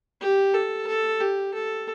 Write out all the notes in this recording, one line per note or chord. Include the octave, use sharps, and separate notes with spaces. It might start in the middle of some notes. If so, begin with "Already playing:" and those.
G4
A4
A4
G4
A4